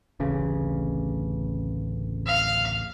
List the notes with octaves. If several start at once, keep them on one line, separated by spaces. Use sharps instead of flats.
D1 A1 C#3
F5